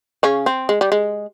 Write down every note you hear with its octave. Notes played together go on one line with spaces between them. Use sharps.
C#3 C#4
C4
G#3
G3
G#3